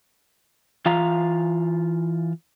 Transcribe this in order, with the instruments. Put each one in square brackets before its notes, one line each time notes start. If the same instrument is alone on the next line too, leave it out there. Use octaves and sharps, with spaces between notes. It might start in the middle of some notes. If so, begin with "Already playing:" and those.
[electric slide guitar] E3 F4 F5 A#5